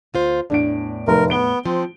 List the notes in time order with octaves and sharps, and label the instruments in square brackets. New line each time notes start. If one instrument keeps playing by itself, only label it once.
[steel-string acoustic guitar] D2 F4 C5
[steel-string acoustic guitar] E2 A2 [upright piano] D4 D7
[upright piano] F1 [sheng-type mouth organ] A#4
[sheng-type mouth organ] B3 [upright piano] D7 G7
[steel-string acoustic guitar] F3 [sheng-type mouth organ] C4